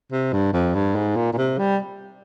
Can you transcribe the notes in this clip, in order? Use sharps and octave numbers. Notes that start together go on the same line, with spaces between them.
C3
G2
F2
G2
G#2
A#2
A#2
C3
G3